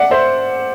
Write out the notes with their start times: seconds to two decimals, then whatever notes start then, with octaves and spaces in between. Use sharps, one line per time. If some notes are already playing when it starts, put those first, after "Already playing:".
Already playing: D5 E5 F#5
0.11 C5 E5